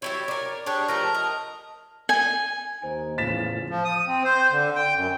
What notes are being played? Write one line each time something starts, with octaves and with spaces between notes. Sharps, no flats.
F#3 G3 E4 C#5
A#4 D5
D4 G4 G#4 C#5 C#6
F3 G3 A3 A#4 A#5
D#5
G#5
D#2 D#4 C5 G#5
E2 A2 C#3 F4 A6 B6 E7
F3
D#6
C4
C5
D3
G5
F#2